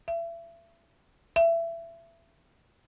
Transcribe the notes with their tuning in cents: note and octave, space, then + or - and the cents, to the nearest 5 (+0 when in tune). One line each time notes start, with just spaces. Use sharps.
E5 +35
E5 +25